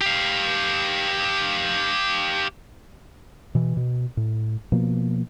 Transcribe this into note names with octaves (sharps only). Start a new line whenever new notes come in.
G4 F5
B2 E3
B2
A2
B2 F3 A#3